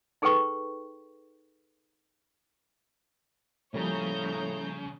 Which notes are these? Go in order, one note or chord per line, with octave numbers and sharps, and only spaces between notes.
D#4 G#4 A4 B4 G5 C#6
A2 C#3 F3 G3 A#3 C#5 A#5 G6